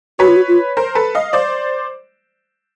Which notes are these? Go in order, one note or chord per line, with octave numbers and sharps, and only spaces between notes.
F#4 B4 C#5
F4
F#4
F4
A#4 C5
A4 B4
D#5 F5
C5 D5